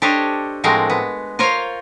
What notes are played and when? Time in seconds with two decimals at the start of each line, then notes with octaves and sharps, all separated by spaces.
0.02 D4 G4 A4 C5 C#5 D#5
0.64 A2 F3 G#3 C4 F#4 A#4
0.90 B3
1.39 F4 A#4 C5 C#5 F5